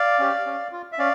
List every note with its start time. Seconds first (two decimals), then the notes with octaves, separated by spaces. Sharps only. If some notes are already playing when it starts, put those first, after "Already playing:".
Already playing: D5 F5
0.19 C#4 G4
0.46 C#4
0.72 F4
0.92 E5
0.99 C#4 D5 F5